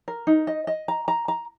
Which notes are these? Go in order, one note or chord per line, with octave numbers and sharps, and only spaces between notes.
A#4
D#4
D#5
D#5
A#5
A#5
A#5